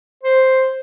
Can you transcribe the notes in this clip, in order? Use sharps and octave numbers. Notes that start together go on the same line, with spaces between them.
C5